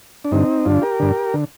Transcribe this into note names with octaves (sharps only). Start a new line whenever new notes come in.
D4
G2 D3 C4 D#4
G2 D3 D4 F4
G4 A#4
G2 D3
D3